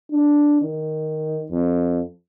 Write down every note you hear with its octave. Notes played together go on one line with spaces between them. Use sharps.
D4
D#3
F2